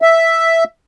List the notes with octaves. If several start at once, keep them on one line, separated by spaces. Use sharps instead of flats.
E5